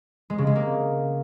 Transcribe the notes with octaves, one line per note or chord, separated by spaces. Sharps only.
G#3
C#3
G#3
A#3